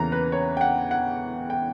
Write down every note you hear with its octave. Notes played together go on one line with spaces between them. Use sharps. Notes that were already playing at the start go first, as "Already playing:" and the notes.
Already playing: E2 C#3 E3 A#3 C#4 A#5
B4
C#5
G5
F#5
F#5
G5